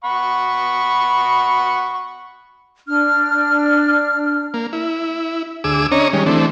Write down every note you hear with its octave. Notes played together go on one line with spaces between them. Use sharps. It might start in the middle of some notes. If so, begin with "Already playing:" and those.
F#5 B5 C#6
D4 F6
A#3
E4
D2 G#4 D6 E6
C#4 D4 C#5 D#5 A#5
D#3 G3 G#3 C#4
E3 A3 C4 D4